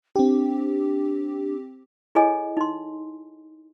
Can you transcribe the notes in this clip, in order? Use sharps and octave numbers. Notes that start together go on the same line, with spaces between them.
C4 D4 G4
E4 G#4 A4 C#5 D#5 G#5
D#4 C6